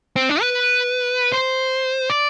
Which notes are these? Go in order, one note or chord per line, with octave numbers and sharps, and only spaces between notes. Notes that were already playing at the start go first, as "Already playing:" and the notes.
C4
D4
B4
C5
D5